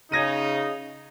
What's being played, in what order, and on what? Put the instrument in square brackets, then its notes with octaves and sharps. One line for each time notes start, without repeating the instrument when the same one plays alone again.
[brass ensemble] C#3 D#4 [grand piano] G#6 A#6 D#7